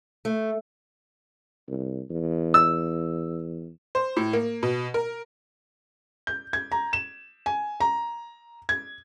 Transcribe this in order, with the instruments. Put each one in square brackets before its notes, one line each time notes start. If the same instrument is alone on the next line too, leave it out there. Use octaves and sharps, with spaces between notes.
[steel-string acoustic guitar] A3
[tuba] C2
E2
[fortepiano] E6
[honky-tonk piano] C5
A2
A#3
B2
A#4
[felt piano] G6
G#6
A#5
E7
G#5
A#5
G#6